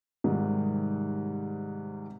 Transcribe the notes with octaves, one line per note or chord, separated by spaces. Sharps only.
G#2 C3 D#3 G3 G#3